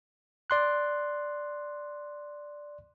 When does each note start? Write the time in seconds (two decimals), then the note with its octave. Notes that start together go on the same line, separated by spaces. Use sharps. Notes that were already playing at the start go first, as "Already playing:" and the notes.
0.50 D5 C6 F#6